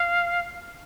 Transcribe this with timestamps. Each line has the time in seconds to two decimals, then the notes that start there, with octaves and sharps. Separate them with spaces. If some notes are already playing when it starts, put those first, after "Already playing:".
Already playing: F5